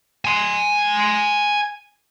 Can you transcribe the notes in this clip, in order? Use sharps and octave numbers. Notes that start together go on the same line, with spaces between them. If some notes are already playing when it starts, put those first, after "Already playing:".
G#5 C6